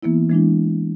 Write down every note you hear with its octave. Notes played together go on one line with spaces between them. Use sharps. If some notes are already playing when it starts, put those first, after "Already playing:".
E3 A#3 B3 E4
E3 G#3 D4 E4